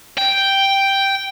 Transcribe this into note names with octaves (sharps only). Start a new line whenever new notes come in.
G5